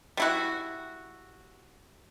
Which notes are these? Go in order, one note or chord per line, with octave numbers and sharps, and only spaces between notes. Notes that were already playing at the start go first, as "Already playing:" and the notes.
G3 E4 F#4